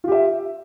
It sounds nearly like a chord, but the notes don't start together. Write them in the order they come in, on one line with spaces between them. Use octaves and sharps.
F4 G4 E5